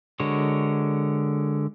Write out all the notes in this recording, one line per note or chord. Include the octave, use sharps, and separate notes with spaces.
D3 G#3 F#4 A#4 C#5